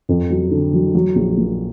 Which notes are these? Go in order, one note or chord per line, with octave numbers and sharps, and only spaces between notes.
F2
F#3
D3
F#3
F#3
A#1
A#2